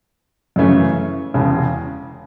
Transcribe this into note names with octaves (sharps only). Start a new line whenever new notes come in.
F#2 C#3 E3 A3 C#4
E1 E2 C#3